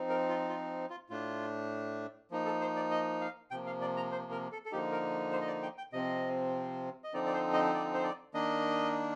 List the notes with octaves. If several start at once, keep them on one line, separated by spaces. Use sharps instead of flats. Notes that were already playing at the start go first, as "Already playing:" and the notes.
Already playing: F3 C4 D#4
A#4
F4
F4
F4
A2 A3 D4 F4
F3 A#3 D#4
A4
C5
D5
D#5
F5
C3 F3 A#3 G5
F5
D5
A#5
C5
A#4
A4
A4
D3 F3 A#3 D#4 G4
A#4
C5
D#5
D5
G5
G5
C3 F3 C4 D#5
D#5
D3 F3 C4 D#4 D5
D5
C5
D#5
D5
C5
D5
D#3 A#3 D4 D#5